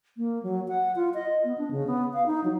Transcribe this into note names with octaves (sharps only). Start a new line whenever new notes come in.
A#3
F#3
F#5
F4
D#5
B3
D4
C#3
B3
F5
D#4
F#3